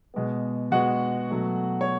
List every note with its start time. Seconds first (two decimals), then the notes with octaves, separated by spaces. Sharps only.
0.14 B2 G#3 B3
0.71 B2 G#3 B3 F#4 F#5
1.30 B2 F#3 A3
1.81 C#5